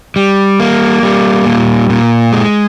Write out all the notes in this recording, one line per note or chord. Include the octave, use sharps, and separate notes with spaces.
G3
A#3
G3
A#2
A#2
G#3